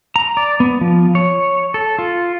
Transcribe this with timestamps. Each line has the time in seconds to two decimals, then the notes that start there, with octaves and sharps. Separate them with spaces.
0.16 A#5
0.37 D5
0.60 B3
0.81 F3
1.15 C#5
1.74 A4
1.99 F4